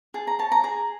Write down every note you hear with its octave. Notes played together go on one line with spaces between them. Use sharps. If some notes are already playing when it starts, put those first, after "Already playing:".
G#4 A5
A#5
C#5 A5
A#5
G#4 A#5